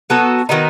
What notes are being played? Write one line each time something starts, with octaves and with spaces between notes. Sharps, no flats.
F#3 B3 F#4 A4
D#3 F#3 B3 D#4